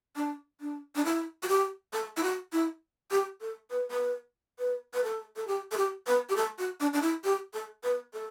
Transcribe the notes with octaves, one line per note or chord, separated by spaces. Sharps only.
D4
D4
D4
E4
F#4
G4
A4
E4
F#4
E4
G4
A4
B4
B4
B4
B4
A4
A4
G4
A4
G4
B4
G4
A4
F#4
D4
D4
E4
G4
A4
B4
A4